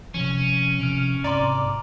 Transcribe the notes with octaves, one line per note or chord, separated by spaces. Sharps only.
C3 F3 C#4
C3 F3 F6 D7 F7
G#2 C3 D5 A#5 C6